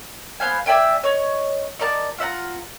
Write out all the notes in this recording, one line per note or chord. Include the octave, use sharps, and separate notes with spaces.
B3 C5 F5 G#5
D5 E5 G5 G#5
C#5 D#5 C#6
D#4 A#4 D5 A5
F4 E5 F#5 A#5